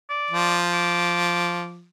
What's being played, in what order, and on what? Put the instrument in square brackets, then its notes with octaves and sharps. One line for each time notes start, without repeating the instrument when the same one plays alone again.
[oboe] D5
[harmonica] F3
[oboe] D6